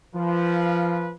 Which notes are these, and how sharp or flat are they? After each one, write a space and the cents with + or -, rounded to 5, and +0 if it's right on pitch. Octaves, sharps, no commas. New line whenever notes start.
F3 -20 B4 -20 F5 +0